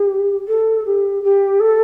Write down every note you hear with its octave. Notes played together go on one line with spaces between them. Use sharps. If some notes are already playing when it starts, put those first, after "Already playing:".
Already playing: G4
A4
G4
G4
A4